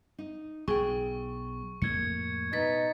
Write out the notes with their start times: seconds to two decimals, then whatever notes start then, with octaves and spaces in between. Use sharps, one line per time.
0.18 D#4
0.68 B1 G#4 G5 C#6
1.82 F2 A2 A#3 G#6 C#7
2.53 B2 D#4 A6 B6